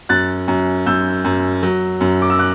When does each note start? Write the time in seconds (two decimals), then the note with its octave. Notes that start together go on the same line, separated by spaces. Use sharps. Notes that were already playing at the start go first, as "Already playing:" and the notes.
0.09 F#2 F#6 A6
0.48 F#2
0.86 F#2 E6 G6
1.25 F#2
1.63 F#3
2.01 F#2
2.22 D6
2.30 E6
2.39 D6 F#6